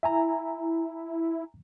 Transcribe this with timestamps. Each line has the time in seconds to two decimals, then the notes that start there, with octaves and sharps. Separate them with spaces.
0.03 E4 E5 G#5 A#5